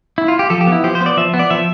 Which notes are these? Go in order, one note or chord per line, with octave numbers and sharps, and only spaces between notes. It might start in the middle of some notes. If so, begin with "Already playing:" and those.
E4
F4
G4
F3 A4
G4
B3
E4
F3 G4
C5
B3
D5
F3 E5
B3
D5
F3 E5